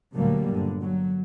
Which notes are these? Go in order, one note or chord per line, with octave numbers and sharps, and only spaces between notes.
D2 A#2 D3 F#3 G3 A#3
G1 D3
F#3